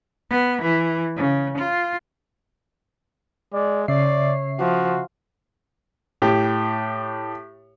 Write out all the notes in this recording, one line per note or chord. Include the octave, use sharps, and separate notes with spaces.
B3
E3
C#3
F4
G#3 D5
C#3 C#5 D5 E5 C7
F3 F#4
A2 G4